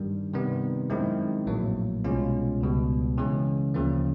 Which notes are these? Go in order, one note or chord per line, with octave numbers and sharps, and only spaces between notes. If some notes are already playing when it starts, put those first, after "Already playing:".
Already playing: G2 D#3 G3
C3 D#3 G3 B3
F#2 D#3 G#3 C4 E4
A#1 A2 F#3 A#3
C2 B2 G#3 C#4 F4
C#2 B2 G3
C#3 E3 G#3 C#4
D2 C#3 F3 A#3